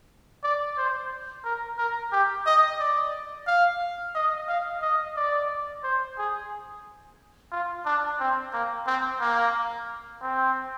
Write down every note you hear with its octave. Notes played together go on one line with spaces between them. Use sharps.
D5
C5
A#4
A#4
G4
D#5
D5
F5
D#5
F5
D#5
D5
C5
G#4
F4
D4
C4
A#3
C4
A#3
C4